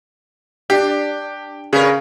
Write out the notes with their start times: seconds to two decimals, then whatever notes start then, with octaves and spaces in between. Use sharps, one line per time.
0.70 D4 G4
1.73 C#3 C#4 A#4 B4